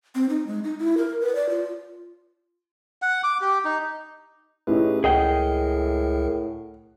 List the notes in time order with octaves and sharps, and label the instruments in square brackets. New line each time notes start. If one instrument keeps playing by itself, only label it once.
[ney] C4
D#4
G#3
D#4
E4
A#4
B4
D5
F4
[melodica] F#5
D6
G4
D#4
[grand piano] A2 C#4 D#4 [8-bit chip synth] G4 G#4 B4
[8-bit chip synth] C#2 A#4 [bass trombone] A2 [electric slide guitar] G#4 D#5 G5 [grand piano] F#5